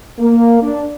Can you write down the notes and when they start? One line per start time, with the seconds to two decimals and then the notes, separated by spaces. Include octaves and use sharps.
0.20 A#3
0.62 D4